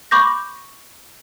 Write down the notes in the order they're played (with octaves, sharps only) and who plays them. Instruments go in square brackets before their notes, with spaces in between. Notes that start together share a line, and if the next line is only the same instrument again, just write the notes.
[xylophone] B5 C#6 D6 G6 A#6